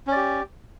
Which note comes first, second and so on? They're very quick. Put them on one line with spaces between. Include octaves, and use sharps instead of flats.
C#4 D5 G4